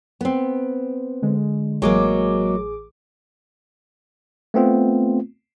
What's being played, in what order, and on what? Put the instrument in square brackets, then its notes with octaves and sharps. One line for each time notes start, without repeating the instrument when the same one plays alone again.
[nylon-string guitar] B3 C4
[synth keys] D3 G#3
[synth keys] A1 G#4 D6 [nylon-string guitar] F#3 G#3 A#3
[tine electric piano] A3 B3 C4 F4